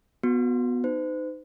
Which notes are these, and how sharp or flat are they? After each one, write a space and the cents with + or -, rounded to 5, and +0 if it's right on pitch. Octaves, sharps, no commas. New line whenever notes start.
B3 +0 F#4 -20
D#4 -10 C5 -40